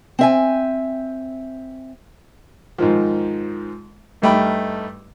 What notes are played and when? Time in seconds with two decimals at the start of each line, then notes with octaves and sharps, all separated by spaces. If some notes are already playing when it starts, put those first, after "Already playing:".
0.19 C4 E5 G#5
2.78 G#2 D#3 F3
4.22 G2 G3 A3 D#4 G5 B5